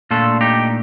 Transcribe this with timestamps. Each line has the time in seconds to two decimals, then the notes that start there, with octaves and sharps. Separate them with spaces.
0.11 A#2 A3 D4 F4 A4
0.41 D#4 G4